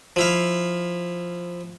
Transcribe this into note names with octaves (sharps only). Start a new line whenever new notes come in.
F3 E4 F5